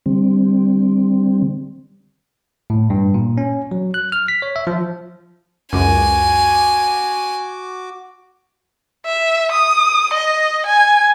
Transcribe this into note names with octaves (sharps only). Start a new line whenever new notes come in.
D3 G3 C4
A2
G2
A#2
C#4
F#3
F#6
F6
B6
C#5
E5
F3
C#2 F#2 F#4 G#5 D6
E5
D#6
D#5
G#5